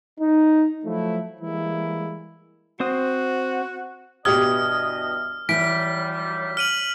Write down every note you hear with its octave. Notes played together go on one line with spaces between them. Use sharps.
D#4
F3 F#3 A3 E4
E3 G3 G#3 A#3 E4
C4 F#4 C5 D#6
G2 B2 E3 G4 D#5 D#6 F6 G#6
D#2 E3 F#3 G3 B6 D7
F6 D#7 F#7